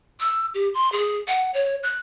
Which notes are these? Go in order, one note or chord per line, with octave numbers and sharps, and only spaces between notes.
E6
G4
C6
G#4
F#5
C#5
F#6